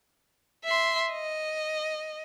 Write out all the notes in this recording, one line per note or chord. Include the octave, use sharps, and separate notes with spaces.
E5 C6
D#5